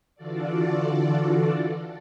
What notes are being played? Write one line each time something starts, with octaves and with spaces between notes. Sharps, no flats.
D3 E3 F4 F#4 A4 D5